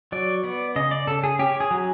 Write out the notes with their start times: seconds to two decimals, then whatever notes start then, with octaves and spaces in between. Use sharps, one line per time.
0.12 F#3 D5
0.44 B3 D5
0.76 C#3 D#5
0.91 D5
1.07 C#3 A4
1.24 G#4
1.39 C#4 G4
1.60 G#4
1.71 F#3